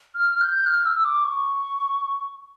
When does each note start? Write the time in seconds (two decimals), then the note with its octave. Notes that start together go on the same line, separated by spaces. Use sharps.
0.15 F6
0.29 F6
0.41 G6
0.56 G6
0.66 F6
0.85 E6
0.99 E6
1.05 D6
1.24 C#6